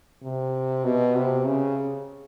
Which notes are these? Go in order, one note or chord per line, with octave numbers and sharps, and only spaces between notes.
C3
B2
C3
C#3